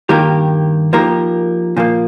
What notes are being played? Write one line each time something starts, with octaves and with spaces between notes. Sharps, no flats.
G2 D#3 A#3 G4 A#4
F3 A#3 D#4 G4 A#4
A#2 F3 A#3